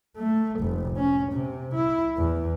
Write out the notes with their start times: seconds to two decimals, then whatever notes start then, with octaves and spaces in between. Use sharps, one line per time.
0.17 A3
0.60 F1
0.97 C#4
1.32 C3
1.74 E4
2.17 E2